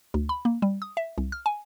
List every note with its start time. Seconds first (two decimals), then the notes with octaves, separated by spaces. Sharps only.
0.14 D2
0.29 B5
0.45 A#3
0.62 G3
0.82 D#6
0.97 E5
1.18 C2
1.32 F6
1.46 G#5